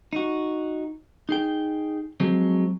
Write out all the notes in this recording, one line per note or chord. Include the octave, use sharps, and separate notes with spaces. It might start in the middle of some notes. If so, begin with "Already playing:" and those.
D#4 F#4
D#4 G#4 G5
F3 F#3 G#3 C4